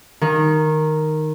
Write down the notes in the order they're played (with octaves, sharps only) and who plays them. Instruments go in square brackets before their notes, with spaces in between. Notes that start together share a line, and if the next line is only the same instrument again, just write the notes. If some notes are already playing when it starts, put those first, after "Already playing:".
[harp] D#3